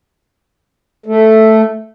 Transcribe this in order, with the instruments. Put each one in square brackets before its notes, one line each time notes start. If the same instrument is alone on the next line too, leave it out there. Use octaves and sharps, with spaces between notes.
[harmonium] A3